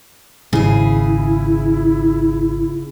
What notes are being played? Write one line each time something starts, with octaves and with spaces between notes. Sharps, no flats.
G#1 C#3 E4 G#4